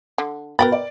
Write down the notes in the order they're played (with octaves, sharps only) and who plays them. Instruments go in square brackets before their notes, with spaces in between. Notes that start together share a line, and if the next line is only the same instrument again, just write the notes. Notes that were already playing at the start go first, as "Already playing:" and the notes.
[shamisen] D3
[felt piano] B2 B4 A6 [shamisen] A#4 G5 B5
[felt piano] D5